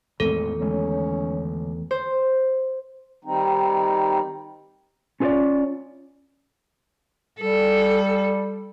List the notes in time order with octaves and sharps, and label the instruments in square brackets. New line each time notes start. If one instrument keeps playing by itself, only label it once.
[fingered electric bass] A1 G#3 C4 [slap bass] E2 D#3 A3 [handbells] A4
[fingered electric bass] D3 G#3 [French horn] C#4
[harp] C5
[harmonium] D#3 G3 C4 D#4
[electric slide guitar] C#4 F4 G#4 B4 C#5 D5
[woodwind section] G3 [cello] A4